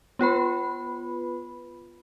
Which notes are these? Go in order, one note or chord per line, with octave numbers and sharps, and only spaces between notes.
B3 F4 B4 B5